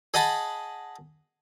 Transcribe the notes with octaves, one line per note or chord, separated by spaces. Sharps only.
G#4 D#5 F#5 A5 B5